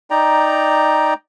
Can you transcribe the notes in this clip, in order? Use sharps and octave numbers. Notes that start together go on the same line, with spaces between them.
D#4 D5 G5 A#5